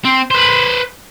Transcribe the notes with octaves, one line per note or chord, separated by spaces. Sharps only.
C4
B4 C5